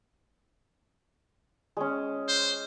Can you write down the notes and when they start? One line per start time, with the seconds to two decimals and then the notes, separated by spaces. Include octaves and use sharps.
1.77 G#3 C#4
2.28 C5